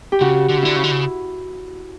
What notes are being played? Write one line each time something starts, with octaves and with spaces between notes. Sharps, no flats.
G4
C#3 F#4
D3
C#3
D3 E4
C#3
D3
C#3